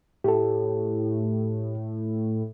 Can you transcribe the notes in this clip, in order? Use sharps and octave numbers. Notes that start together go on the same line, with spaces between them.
A2 G4 A4